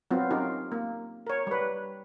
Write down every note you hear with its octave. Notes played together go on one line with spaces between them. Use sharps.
F#3 B3 C4 F4
C#4 D#4 F4 G4 A#4
A#3
A#4 C#5
G3 B4